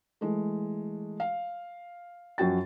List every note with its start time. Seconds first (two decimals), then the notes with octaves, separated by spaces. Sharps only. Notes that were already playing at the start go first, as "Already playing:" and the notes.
0.21 E3 G#3 A3
1.20 F5
2.38 F#2 F3 F#4 G5 A6